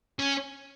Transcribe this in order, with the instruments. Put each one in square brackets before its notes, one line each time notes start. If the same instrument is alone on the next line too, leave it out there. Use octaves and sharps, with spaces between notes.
[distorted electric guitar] C#4